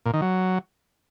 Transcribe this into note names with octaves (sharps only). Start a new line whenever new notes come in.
A#2
D#3
F#3